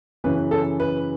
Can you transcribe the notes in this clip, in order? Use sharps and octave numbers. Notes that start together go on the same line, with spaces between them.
F#2 C#3 E3 B4
A4
B4